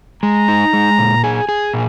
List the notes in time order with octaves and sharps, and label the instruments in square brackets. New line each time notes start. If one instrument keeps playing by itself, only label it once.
[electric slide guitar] G#3 [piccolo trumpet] A#5
[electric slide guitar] D#4
G#3
A#2
[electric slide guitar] G#4 [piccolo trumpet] G#5
[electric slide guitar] G#4
A#2